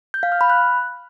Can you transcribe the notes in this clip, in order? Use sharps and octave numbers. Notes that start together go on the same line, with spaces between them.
G6
F5
F6
B5
F#6